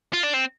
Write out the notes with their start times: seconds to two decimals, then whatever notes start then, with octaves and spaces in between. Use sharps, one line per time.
0.13 F4
0.23 D4
0.33 C4